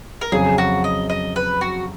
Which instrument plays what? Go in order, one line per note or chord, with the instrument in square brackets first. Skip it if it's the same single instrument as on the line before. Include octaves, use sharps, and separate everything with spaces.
[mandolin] A#4
[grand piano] F2 C#3 F#3 [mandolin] G#4
[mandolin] F#4
D#5
D#5
B4
F#4